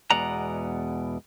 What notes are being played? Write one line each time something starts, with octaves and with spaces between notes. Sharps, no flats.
E2 B2 G#3 D5 F#5 A#5